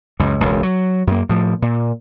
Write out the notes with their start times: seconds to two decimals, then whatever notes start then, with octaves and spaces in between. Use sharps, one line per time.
0.20 C#2 F#2
0.40 E1 C#2
0.63 F#3
1.07 F#2 A#3
1.29 A2 F3
1.62 A#2